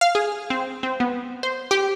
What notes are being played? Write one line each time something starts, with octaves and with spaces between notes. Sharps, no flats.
F5
G#4
C4
C4
B3
C5
G4